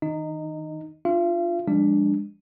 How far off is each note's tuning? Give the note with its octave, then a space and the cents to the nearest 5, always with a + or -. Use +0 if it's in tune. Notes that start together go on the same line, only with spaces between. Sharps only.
D#3 +30 D#4 -20 D#5 +0
D4 +35 F4 +0 F5 -45
F3 +0 G#3 -35 D4 +0